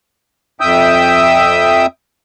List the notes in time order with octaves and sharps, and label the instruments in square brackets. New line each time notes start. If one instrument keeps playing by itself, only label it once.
[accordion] F2 E5 G5 D#6 E6 G6